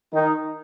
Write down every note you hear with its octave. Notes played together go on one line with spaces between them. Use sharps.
D#3 D#4